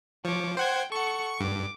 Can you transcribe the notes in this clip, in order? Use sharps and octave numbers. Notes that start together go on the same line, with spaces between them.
F3 C#5 D6
C5 F#5 G5 G#6
A4 F#5 C#6 C#7
G2 D6